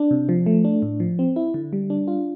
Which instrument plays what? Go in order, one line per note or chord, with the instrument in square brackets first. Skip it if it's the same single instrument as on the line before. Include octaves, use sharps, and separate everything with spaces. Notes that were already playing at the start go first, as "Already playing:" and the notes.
Already playing: [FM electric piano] D4
C3
F3
A3
D4
A2
F3
C4
E4
D3
G3
D4
F4